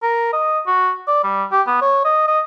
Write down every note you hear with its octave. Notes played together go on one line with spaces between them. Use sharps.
A#4
D#5
F#4
D5
G3
G4
B3
C#5
D#5
D#5